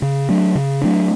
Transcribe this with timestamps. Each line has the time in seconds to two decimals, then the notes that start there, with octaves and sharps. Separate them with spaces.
0.02 C#3
0.29 F#3 A3 D4
0.55 C#3
0.81 F#3 A3 D4